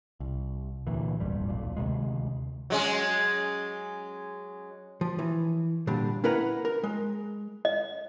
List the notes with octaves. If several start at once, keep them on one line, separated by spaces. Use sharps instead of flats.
C2
D2 A#2 E3
D#1 G#1 F2 G3
D#1 B1 A#2
D2 C3 D#3 G#3
F#3 G#3 C#4
F3
E3
A#2 D3 G3 D4
C#4 E4 A#4 B4 F#5 A#5
A#4
G#3
D#5